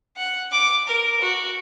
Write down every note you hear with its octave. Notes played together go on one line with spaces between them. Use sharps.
F#5
D6
A#4
F#4